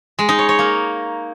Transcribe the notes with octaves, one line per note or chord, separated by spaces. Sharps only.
G#3
D#4
C#5
C#5
A#3